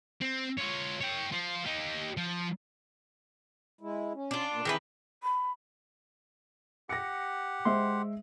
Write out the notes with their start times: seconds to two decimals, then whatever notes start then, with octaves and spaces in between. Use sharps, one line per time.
0.21 C4
0.58 F4 C#5
1.01 C#5 G5
1.32 F4 C5
1.65 D#4 G4
2.17 F3
3.81 G#3 E4
4.14 C#4
4.31 D4 F4
4.53 B2 A#3
4.65 D#3 E3 C4 E4 G#4 B4
5.23 B5
6.89 G4 F#5 A#6 C#7
7.65 G#3 C5 E5 C6